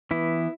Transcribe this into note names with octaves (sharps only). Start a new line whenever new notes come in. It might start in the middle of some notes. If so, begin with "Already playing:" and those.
E3 B3 E4